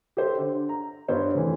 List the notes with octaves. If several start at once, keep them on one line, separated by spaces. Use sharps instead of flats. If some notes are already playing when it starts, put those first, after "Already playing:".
G4 A4 C5
D3
A#5
G2 B3 C5 C#5
F1 E3